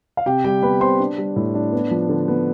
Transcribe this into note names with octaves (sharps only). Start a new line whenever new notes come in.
F5
C3 G4 G5
G3 G4 G5
B3 B4 B5
C3 C5 C6
D4
G3
A2
D4
B3
F3
D3
B3